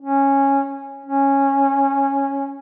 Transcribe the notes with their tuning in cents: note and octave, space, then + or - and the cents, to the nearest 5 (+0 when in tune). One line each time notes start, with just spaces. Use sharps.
C#4 -10
C#4 -10